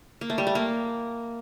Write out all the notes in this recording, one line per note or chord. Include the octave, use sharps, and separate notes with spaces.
A#3
A3
G3
A3
A#3